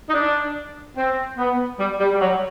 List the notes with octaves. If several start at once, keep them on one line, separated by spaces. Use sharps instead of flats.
D#4
D4
C4
B3
G3
G3
G3
F#3